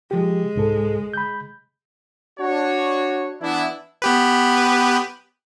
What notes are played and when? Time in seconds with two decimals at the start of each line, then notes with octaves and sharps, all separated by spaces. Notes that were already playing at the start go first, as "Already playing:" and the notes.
0.11 F3 G#3 G4
0.56 C2 G#2 A4
1.14 B5 G6
2.40 D4 F#4 C#5
3.42 E3 B3 D4 E4
4.02 B3 G4 B4